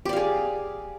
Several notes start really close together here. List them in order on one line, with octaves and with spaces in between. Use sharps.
G4 D5 F5 G#4